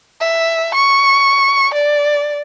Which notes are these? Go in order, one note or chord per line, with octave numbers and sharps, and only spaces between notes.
E5
C#6
D5